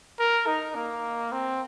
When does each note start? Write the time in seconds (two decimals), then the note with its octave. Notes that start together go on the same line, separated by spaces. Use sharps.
0.19 A#4
0.47 D#4
0.75 A#3
1.32 C4